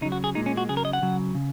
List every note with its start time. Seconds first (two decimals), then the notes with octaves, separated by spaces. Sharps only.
0.01 C#3 D#4
0.05 F#3
0.12 F#4
0.24 G#4
0.35 A#2 G#3 D#4
0.46 C#4
0.57 F#4
0.69 C#3 F#3 G#4
0.77 A#4
0.85 D#5
0.93 F#5
1.02 C#3 F#3
1.35 C#3